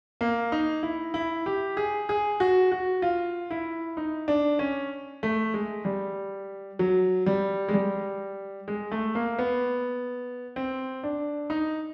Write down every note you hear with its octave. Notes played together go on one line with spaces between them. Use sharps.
A#3
D#4
E4
E4
G4
G#4
G#4
F#4
F#4
F4
E4
D#4
D4
C#4
A3
G#3
G3
F#3
G3
G#3
G3
G#3
A3
A#3
B3
C4
D4
D#4